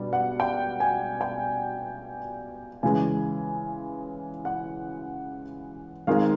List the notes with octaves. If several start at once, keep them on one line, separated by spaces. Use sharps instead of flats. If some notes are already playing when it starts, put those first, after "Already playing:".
Already playing: B2 G3 D4
F#5
G5
G#5
G5
C#3 E3 G#3 G#5
F#5
D#3 G#3 C4 D#4 F5